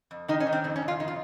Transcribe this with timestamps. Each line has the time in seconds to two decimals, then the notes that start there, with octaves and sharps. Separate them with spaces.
0.11 F2
0.28 D#3 D#4
0.40 C#4
0.47 D#3
0.53 C4
0.64 F2 C4
0.76 C#4
0.82 F2
0.88 F4
1.00 D#3 D#4
1.08 F4